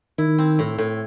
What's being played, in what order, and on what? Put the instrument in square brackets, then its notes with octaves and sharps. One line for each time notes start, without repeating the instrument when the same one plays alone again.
[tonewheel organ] D#3 [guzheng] E4
[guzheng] C4
A2
A2